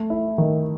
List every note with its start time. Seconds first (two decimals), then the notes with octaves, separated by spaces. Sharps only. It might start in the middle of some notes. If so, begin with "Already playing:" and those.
Already playing: A3
0.10 E4
0.38 D#3